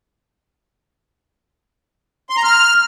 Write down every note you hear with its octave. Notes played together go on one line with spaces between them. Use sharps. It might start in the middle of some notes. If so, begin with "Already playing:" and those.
C6
A#5
F6